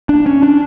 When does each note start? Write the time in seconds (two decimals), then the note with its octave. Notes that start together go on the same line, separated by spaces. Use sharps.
0.09 D4
0.26 C#4
0.43 D4